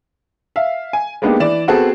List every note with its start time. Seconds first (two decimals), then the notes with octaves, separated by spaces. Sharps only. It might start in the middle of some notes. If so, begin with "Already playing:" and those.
0.56 E5 F5
0.93 G#5
1.22 G#3 A#3 B3 D4 D#4 G4
1.40 E3 D5 E7
1.68 B3 C4 F#4 G#4 A4